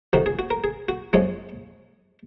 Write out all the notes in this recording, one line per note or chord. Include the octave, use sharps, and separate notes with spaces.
F2 C3 D#3 F#4
G#4
F#4
A#4
G#4
F#4
F#2 F3 G#3 C#4 G#4